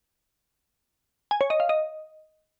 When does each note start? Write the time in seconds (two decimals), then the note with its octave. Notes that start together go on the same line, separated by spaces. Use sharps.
1.31 G#5
1.41 C#5
1.50 D#5
1.60 F5
1.69 D#5